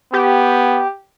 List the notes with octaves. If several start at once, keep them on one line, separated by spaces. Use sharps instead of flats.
B3 G4